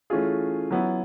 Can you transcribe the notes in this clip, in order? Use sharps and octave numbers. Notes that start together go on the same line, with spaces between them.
E3 A3 C#4 F4 G#4
F#3 B3 E4